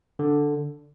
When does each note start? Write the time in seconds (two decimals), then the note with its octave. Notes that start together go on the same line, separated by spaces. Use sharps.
0.19 D3